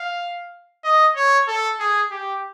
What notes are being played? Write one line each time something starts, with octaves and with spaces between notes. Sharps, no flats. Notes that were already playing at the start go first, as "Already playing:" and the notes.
Already playing: F5
D#5
C#5
A4
G#4
G4